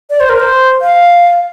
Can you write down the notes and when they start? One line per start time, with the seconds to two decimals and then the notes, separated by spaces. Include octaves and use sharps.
0.10 D5
0.20 C5
0.29 A#4
0.40 C5
0.81 F5